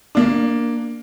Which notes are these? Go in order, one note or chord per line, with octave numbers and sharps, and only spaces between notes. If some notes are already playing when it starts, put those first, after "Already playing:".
A#3 D4